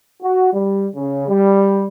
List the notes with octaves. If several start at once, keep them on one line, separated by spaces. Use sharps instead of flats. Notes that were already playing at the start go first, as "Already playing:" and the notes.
F#4
G3
C#3
G3